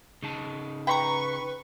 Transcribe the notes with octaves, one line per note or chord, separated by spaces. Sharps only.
C#3 D#4 A5
B4 G5 A#5 C#6